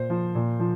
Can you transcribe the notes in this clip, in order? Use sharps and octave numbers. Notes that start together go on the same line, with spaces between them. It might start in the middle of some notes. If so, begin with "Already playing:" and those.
Already playing: A#2 C5
F3
A#2
F3